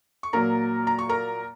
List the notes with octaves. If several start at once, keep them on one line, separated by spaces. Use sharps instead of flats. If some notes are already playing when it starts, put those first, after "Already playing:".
C#6
A#2 F#3 A#3 A#4 A#5
A#5
C#6
A#4 A#5